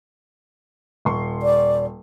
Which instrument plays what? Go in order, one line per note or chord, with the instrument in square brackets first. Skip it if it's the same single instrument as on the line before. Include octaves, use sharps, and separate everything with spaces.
[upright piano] D#1 C6 C#6
[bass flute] D5